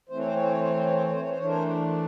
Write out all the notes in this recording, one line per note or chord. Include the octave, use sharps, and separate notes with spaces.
E3 A3 C4 C5
C#5
C5
C#5
C5
C#5
C5
C#5
C5
C#5
C5
C#5
C5
C#5
C5
E3 A3 D4 C#5
A#4 C5